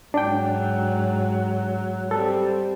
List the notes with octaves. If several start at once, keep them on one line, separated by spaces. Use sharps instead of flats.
G#2 F#3 D4 G5
G3 C4 A4